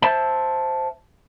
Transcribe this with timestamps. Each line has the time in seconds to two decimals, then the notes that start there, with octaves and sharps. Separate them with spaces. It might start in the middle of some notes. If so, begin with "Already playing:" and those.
0.02 C5 E5 A5